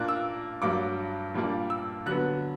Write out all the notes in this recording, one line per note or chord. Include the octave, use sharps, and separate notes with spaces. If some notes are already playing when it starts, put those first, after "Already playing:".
Already playing: A#2 A#3 D4 F#6
E6
G2 F#3 A#3 D4 D6
A#2 G3 A#3 D4
E6
D3 F#3 B3 F#6